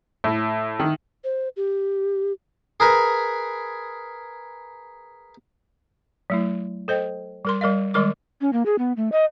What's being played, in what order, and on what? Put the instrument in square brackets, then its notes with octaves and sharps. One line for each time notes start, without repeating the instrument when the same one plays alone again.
[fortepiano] A2
D#3
[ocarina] C5
G4
[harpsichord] G#4 A#4 B4 G#5
[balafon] F#3 A3 E4
A4 C5 D#5 G5
G3 A#4 C6
G3 A#4 D#5 F5
D#3 G3 G#3 A#4 C#6 D6
[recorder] C#4
A#3
G#4
B3
A3
D#5